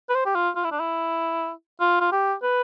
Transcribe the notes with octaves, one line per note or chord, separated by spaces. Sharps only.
B4
C5
G4
F4
F4
E4
D4
E4
F4
F4
G4
B4